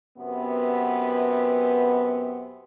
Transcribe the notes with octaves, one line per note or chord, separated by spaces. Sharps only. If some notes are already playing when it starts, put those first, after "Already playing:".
F#2 C3 B3